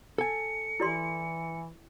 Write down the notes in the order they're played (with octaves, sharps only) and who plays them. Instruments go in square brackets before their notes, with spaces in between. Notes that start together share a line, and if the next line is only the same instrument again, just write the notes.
[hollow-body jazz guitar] A4 G#5 [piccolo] C#7
[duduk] E3 [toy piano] E4 D5 C6